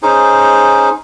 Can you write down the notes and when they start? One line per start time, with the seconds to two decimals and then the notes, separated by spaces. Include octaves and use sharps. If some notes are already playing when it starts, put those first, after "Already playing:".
0.03 C#4 D#4 G#4 C5